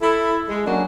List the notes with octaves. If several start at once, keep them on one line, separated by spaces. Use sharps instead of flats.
E4 A4
G#3
F#3 A#3 C#4 D4